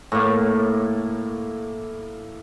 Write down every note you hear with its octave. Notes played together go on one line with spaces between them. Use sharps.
A2 A#3